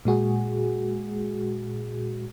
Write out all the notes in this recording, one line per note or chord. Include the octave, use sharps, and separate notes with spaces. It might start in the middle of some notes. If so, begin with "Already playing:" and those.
A#2 G#3 F#4 G#4